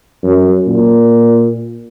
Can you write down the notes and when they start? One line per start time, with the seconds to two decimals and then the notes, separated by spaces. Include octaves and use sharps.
0.23 F#2
0.67 A#2